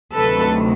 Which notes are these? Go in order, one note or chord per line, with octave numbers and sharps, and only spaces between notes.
D2 C3 D#3 F#3 A4 B4